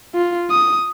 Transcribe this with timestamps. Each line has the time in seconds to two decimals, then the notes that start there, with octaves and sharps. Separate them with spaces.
0.15 F4
0.51 D#6